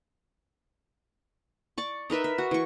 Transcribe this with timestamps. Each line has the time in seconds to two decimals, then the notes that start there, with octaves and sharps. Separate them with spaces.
1.78 D5 C#6
2.10 D#4 A#4 B4 E5
2.24 E5
2.38 F#4
2.51 E3 C#6